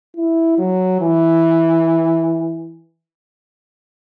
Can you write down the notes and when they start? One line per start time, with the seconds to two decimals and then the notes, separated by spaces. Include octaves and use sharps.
0.16 E4
0.58 F#3
1.01 E3